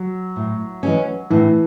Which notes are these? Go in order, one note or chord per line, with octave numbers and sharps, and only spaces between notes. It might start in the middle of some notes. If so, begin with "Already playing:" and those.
Already playing: F#3
A2
E3 G#3 C#4
A2 E3